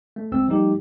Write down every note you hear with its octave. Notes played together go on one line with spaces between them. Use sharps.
A3
C#2 C4 E6
F3 G3 A3 D#4 G4